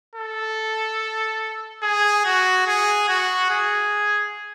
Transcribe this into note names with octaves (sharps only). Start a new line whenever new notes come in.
A4
G#4
F#4
G#4
F#4
G#4